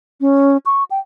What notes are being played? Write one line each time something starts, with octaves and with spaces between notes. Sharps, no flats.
C#4
C#6
G5